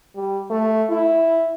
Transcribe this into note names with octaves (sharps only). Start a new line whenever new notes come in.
G3
A3
E4